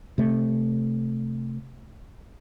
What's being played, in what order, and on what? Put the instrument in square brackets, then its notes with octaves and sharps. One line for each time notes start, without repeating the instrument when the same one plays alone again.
[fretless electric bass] C3 A3